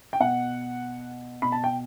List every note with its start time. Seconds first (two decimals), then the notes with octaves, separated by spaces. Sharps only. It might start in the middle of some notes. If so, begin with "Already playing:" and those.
0.13 G5
0.20 B2 F#5
1.42 B2 B5
1.52 A5
1.64 G5